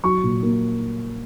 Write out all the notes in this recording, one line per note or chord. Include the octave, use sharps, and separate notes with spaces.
F#3 C#6
A#2
A#3